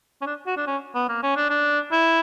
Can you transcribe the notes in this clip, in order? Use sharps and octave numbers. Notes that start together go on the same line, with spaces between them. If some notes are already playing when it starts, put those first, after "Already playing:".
C#4
D4
F#4
D4
C#4
B3
A#3
C#4
D4
D4
E4